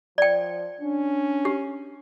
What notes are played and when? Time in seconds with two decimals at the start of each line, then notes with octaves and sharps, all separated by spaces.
0.18 F3 D5 G5
0.81 C#4 D4
1.45 G4